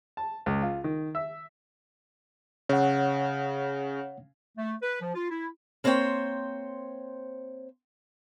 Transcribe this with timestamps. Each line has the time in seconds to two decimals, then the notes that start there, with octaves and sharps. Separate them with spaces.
0.17 A5
0.46 C#2
0.62 F4
0.84 D#3
1.15 E5
2.69 C#3 C#5 F#5
4.58 A3
4.83 B4
5.02 F3
5.15 F4
5.30 E4
5.84 A#3 C4 C5 C#5 F5 G5